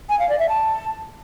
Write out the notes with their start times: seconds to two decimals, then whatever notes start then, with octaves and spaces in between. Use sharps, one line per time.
0.09 G#5
0.19 F5
0.29 D5
0.39 E5
0.49 A5